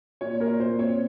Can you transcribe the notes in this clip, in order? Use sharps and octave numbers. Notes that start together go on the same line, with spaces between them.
A#2 C#5
A#2 A#4
A#2 C5
C4 C#5